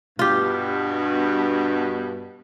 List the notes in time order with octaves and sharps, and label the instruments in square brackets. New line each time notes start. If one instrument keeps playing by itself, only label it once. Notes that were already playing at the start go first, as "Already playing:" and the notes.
[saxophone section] G2 B2 [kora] F4 G4